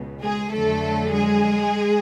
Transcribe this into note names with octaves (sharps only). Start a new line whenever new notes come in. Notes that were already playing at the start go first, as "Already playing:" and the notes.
Already playing: C#2 B2
G#3 G#4
F2 D3 F#3 A3 A4
G#3 G#4